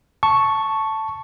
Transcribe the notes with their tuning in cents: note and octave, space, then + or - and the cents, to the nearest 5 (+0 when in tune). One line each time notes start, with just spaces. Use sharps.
A5 +0 C#6 +0